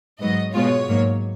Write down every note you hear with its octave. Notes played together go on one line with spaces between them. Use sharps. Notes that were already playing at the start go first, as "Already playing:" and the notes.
G#2 F#3 B3 D#5
B2 G#3 B3 F4 C#5
G#2 F#3 A#3